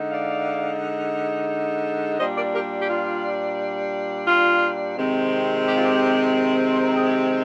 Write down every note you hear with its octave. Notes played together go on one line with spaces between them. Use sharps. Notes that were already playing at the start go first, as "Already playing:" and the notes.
Already playing: D3 G#3 D#4
D5 F5
A#2 G3 D4 C5 D#5
A#4 D5
G4 A#4
G4
F4
F4
C3 D#3 G#3 C4
G4
F4
G4
C5
A#4
G#4
G4